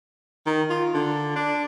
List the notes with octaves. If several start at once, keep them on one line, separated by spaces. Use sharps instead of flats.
D#3
F4
D3
D4